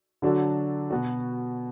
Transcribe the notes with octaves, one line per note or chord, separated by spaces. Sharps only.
D3 F#3 D4 F#4 A4
B2 B3 F#4